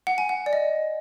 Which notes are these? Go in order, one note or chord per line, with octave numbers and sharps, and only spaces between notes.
F#5
G#5
F#5
D5
D#5